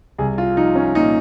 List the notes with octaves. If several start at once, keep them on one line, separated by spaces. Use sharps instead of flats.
C2 G#4
F4
F3 D#4
C#4
A#2 D#4